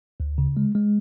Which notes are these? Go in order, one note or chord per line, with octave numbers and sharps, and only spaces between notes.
D2
C#3
G#3
G#3